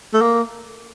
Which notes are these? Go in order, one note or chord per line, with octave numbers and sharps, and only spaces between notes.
A3
A#3